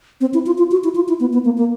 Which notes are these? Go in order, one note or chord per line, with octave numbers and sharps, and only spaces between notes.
C4
E4
F4
F4
F#4
E4
F4
E4
B3
B3
A#3
A#3